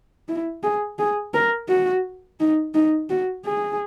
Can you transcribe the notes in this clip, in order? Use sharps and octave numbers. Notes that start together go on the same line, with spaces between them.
E4
G#4
G#4
A#4
F#4
D#4
D#4
F#4
G#4